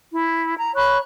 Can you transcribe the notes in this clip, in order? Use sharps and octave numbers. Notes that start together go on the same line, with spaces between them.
E4
A#5
C#5 B5 C#6 F#6